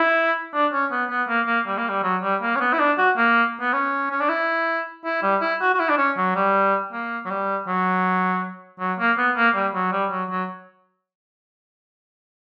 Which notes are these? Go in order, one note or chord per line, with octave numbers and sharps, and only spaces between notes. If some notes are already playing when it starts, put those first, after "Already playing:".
Already playing: E4
D4
C#4
B3
B3
A#3
A#3
G3
A#3
G3
F#3
G3
A#3
C#4
B3
E4
D4
F#4
A#3
B3
C#4
C#4
D4
E4
E4
G3
E4
F#4
F#4
E4
D4
C#4
F#3
G3
A#3
F#3
G3
F#3
F#3
A#3
B3
A#3
G3
F#3
G3
F#3
F#3